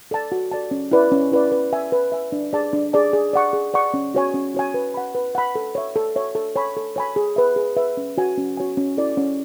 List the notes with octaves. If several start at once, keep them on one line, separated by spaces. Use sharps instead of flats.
A4 D5 A5
F#4
A4 D5 A5
C#4
E4 B4 D5
C#4
E4 B4 D5
B4
E5 G#5
B4
E5 G#5
D4
G#4 D5 A5
D4
G#4 D5 A5
G#4
D5 F#5 C#6
G#4
D5 F#5 C#6
C#4
F#4 C#5 G#5
C#4
F#4 C#5 G#5
B4
F#5 B5
B4
F#5 B5
A4
C#5 E5
A4
C#5 E5
A4
C#5 G#5 B5
A4
C#5 G#5 B5
G#4
B4 E5
G#4
B4 E5
C#4
F#4 C#5 G#5
C#4
F#4 C#5 G#5
C#4
E4 A4 D5
C#4